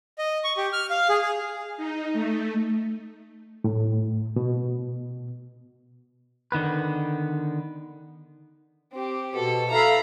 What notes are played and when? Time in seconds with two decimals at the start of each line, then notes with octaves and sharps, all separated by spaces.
0.18 D#5
0.44 C#6
0.57 G4
0.73 F6
0.90 F5
1.09 G#4
1.21 G#4
1.77 D#4
2.13 A3
3.64 A2
4.36 B2
6.52 D3 D#3 B3 B4
8.93 C4 G4
9.35 B2 A4
9.70 E4 A4 F5 A#5 B5